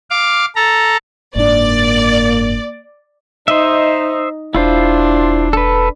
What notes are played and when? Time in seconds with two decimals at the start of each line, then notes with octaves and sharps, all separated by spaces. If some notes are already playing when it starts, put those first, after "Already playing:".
0.10 F5 D6
0.56 A4 A#5
1.35 F#1 G#2 A#3 D4 D5
3.48 D#4 C5 D#5 E5
4.55 E1 D4 E4 F4 C5
5.53 A4 B4